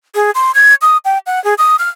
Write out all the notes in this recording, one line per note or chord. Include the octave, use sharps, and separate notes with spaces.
G#4
C6
G#6
D#6
G5
F#5
G#4
D#6
F6